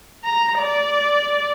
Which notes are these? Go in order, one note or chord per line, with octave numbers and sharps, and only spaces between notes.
A#5
D5